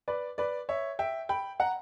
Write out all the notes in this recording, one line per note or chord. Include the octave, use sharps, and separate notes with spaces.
B4 D5
B4 D5
C#5 E5
E5 G5
G5 B5
F#5 A#5